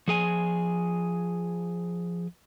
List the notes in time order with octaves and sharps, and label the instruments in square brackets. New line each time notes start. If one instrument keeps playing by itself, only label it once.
[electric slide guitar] F3 G#4 G#5